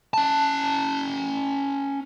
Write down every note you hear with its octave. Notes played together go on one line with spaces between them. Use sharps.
C#4 A5